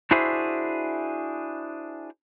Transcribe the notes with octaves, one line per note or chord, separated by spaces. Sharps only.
D4 E4 F#4 G#4 C5 E5